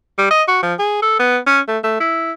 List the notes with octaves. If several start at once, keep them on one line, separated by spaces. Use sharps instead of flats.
G3
D#5
F#4
F3
G#4
A4
B3
C#4
A3
A3
E4